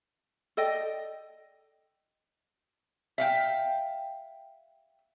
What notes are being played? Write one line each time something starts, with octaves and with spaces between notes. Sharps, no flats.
A4 D5 D#5 G5
E5 F5 G5